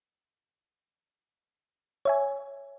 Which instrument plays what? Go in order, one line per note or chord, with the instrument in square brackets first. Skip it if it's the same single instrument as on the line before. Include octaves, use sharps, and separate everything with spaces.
[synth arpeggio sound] C#5 E5 G#5